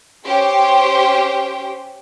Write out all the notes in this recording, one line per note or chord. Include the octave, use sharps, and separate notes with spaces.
C#4 G4 C5 G5